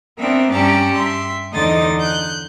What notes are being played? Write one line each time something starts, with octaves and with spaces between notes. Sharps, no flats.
B3 C4 D4 A#4 E5
G2 C#4 G4 D5 A5 A#5
E5 C6
E2 D3 D#4 C5 D#5 A6
F#6 G6